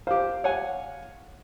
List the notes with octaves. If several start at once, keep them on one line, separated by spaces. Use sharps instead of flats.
G4 C5 F5
C#5 F#5 G#5